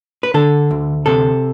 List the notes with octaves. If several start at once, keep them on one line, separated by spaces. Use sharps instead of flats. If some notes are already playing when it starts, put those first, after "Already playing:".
B4
D3 A4
D2
C3 A4